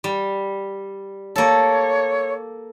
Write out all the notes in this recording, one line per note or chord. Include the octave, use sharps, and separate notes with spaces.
G3
A#3 A4 C#5